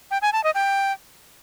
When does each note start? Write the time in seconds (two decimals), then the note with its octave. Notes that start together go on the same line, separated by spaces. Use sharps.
0.11 G5
0.22 G#5
0.33 A5
0.44 D#5
0.55 G5